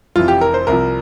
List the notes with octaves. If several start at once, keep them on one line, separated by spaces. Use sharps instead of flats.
F1 F2 E3 F4
G4
A#4
C5
C2 C3 F3 A#4